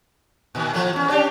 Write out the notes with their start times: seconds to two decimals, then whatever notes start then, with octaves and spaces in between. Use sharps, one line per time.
0.55 A#2 D#3
0.74 A2 F3 A3
0.93 E2 C#4
1.09 C#4 D4 G4